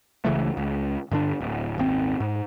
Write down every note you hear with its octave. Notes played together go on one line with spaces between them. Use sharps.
C#2 C#3 E3 A3
C#2
G2 D3 D4
D1
D#1 G#1 C4
G#2